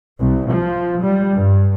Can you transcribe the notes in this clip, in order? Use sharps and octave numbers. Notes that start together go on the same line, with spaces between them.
C2
F3
G3
G2